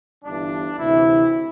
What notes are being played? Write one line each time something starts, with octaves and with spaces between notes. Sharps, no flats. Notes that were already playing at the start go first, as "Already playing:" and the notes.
G1 G2 E3 D4
D2 C3 E3 E4